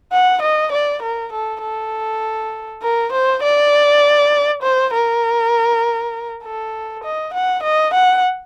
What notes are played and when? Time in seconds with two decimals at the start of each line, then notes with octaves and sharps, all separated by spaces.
0.12 F#5
0.42 D#5
0.72 D5
1.02 A#4
1.32 A4
1.62 A4
2.83 A#4
3.12 C5
3.43 D5
4.63 C5
4.94 A#4
6.43 A4
7.04 D#5
7.34 F#5
7.63 D#5
7.94 F#5